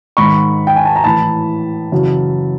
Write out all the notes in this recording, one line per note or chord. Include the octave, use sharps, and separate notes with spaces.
G#2 D#3 B5 C#6
G5
G#5
A5
A#5
A2 E3 A5 B5
F#2 C#3 E3